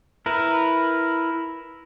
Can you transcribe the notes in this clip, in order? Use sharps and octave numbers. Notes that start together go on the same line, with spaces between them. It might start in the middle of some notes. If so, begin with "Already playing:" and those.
E4 A#4 B4